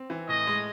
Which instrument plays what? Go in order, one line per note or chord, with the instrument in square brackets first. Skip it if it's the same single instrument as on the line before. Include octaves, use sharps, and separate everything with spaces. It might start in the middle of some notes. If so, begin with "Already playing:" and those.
Already playing: [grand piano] C4
E3
[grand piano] A2 [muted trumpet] D#5
[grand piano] G#3